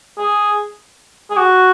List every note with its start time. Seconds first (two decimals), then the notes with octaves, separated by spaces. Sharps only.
0.18 G#4
1.30 G#4
1.37 F#4